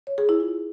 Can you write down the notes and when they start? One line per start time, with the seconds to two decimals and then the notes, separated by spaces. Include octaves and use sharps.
0.07 C#5
0.18 G#4
0.29 E4
0.40 F4